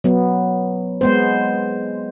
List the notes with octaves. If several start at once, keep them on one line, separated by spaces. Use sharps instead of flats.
F#3 B3
G#3 B3 C5